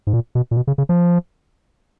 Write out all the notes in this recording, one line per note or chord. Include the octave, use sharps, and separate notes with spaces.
G#2
A#2
B2
A#2
B2
C#3
C#3
F3